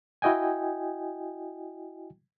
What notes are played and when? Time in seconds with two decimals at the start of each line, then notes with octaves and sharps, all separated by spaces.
0.22 E4 F#4 D#5 G5 G#5